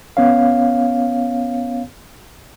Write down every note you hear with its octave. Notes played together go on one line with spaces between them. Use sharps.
B3 C#4 C#5 F5